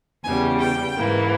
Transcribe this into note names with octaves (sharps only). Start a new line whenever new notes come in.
E2 C#3 G3 G#5
G5
G#2 E3 A#3